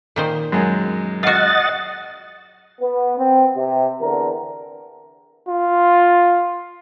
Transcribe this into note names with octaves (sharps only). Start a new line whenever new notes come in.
A#2 D#3 C5
F#2 G#3
F4 F#4 D#5 F#5 A6
B3
C4
C3
E2 D3 A#4
F4